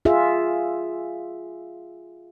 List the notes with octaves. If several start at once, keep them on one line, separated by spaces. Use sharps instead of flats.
F4 G#4 E5